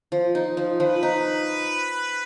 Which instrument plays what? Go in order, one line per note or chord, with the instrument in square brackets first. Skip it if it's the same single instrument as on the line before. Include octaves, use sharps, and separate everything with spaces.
[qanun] F3
D#4
F3
[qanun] F3 [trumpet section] B4
[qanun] D#4